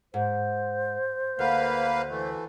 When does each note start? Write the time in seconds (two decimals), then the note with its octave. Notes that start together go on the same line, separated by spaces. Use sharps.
0.14 G#2 C5
1.39 D2 A#3 B4 F5
2.09 E3 A3